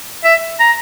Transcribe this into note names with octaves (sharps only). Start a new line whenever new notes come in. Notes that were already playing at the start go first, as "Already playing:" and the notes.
E5
A#5